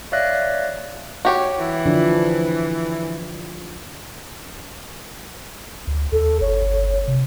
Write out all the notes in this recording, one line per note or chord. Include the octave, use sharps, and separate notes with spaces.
C#5 D5 E5 F5 F#6 A#6
F#4 G4 C#5
E3
D3 F3 D4
D2
D#2 A4
G1 C#5
C3